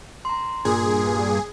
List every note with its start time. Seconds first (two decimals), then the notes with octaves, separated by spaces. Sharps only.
0.25 A#5 C6
0.65 G2 A#2 G#4